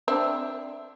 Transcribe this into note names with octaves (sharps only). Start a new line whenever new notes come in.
C4 D4 E5